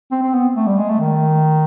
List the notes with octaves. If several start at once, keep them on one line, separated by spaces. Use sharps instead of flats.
C4
C4
B3
A3
G3
G#3
A3
D#3